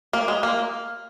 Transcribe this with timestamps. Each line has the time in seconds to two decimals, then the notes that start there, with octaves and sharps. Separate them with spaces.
0.13 A#3
0.28 G#3
0.43 A#3